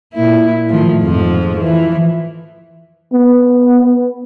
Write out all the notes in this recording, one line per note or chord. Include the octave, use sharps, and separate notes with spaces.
A#2 E4
A2 D#3 F3
F2 G#2 F3
E3 F3
B3